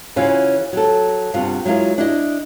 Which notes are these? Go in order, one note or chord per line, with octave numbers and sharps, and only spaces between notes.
C#3 E3 C#4 F4 F#4 B4
F#3 A4
G2 C3 B3 F4 F#4
F#3 G#3 E4 F4 A#4
D4 E4 D#5